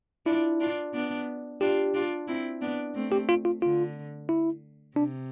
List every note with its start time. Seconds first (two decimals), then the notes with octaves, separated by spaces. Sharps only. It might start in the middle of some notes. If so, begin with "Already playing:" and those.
0.26 D4 E4 F4
0.60 D4 F4
0.94 B3 D4
1.61 D4 F4 G4
1.94 D4 F4
2.28 C4 E4
2.61 B3 D4
2.95 A3 C4
3.12 G4
3.29 F4
3.45 F4
3.62 D3 F4
4.29 E4
4.96 C3 D4